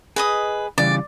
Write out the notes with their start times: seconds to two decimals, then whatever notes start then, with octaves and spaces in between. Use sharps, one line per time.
0.16 G#4 B4 D#5 D#6
0.78 C#3 E3 G3 D5